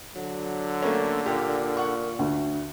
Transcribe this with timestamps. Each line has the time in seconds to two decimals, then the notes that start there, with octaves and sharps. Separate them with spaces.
0.16 D3 F#3
0.82 A3 A#3 C#4
1.26 A#2 G4
1.77 F#5 C#6
2.19 D2